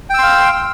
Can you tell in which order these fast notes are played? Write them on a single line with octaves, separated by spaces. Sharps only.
G5 E6 C6 F5